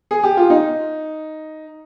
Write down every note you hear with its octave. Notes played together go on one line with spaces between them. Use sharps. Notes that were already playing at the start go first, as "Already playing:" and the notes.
G#4
G4
F4
D#4